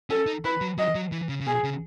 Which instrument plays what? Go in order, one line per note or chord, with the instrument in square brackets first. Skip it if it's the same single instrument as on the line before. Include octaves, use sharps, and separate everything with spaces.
[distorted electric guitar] C#4 [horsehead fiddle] A4
[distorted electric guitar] D#4
[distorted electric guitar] E4 [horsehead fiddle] B4
[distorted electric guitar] F#3
[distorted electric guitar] F#3 [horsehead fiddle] D#5
[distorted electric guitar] F#3
E3
C#3
C#3
[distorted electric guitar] B2 [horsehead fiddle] G#4
[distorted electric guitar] C#3